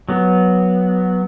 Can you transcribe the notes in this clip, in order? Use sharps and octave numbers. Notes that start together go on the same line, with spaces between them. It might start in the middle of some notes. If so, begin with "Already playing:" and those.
F#3 B3